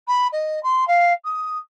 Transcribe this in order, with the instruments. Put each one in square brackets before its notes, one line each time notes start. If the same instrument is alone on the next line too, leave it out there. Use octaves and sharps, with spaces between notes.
[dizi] B5
D#5
C6
F5
D#6